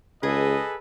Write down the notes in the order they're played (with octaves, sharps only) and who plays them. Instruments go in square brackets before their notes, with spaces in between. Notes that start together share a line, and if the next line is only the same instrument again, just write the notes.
[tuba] C#2 [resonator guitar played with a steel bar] G#4 [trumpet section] A4 B4 D#5